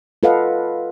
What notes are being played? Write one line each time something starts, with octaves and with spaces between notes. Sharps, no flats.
F4 A4 B4 D#5 F5 F#5